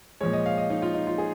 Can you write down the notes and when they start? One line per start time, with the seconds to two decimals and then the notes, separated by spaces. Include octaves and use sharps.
0.21 A#2 F3 G#3 C#5
0.33 D#5
0.46 F5
0.58 D#5
0.70 D#4
0.82 F4
0.94 D#4
1.07 F4
1.18 G#4